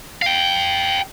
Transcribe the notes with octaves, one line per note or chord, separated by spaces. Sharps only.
F5 G5